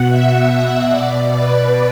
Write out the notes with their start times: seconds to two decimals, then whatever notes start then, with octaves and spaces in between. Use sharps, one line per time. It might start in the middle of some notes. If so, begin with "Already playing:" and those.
Already playing: B2 F#5
0.09 E5
0.91 B2 D5
1.31 B4